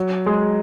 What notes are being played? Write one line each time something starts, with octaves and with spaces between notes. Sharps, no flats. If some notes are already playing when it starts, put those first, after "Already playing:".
Already playing: F#3
G#3